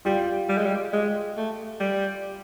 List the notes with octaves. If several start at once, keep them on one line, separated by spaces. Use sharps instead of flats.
G3 F4 G4
G3
G#3
G3
G#3
A3
G3